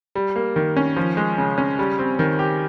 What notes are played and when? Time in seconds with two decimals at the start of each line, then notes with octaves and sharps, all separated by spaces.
0.15 G3
0.36 A#3
0.56 D#3
0.76 C#4
0.96 F3
1.17 G#3
1.38 C#3
1.58 C#4
1.79 G3
1.99 C4
2.19 D#3
2.39 G4